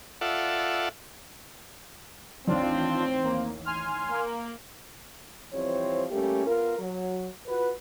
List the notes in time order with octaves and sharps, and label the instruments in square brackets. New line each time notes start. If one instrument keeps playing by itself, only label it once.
[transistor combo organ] F4 A4 D5 E5 F#5
[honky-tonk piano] A1 D#2 [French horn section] C4 [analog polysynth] D4 F4
[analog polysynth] A#3
G#5 C6 F6
[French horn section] A#3
E3 F3 G3 C4 C#5
G3 A3 A#3 C#4 G4
B3 F4 A#4
F#3
F4 F#4 B4